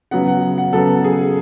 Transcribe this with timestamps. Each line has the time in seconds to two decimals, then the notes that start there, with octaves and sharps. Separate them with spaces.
0.11 C#3 F#3 B3 F#5
0.28 F#5
0.58 F#5
0.73 C#3 F#3 B3 A4
1.04 G#4